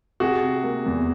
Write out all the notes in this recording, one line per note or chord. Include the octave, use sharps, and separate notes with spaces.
C3 F#4 G#4
C3
A#3
E2